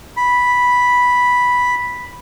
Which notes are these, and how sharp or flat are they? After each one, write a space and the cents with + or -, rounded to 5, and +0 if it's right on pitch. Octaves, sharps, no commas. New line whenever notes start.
B5 -5